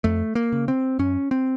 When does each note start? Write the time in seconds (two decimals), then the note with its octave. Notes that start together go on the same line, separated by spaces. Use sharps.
0.04 F2 A3
0.35 A#3
0.52 C#3
0.68 C4
0.99 F#2 C#4
1.31 C4